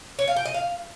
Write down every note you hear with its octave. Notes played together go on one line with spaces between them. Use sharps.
C#5
F5
G5
D#5
F5